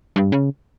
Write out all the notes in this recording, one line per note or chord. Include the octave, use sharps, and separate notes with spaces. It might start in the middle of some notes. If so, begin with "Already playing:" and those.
G2
C#3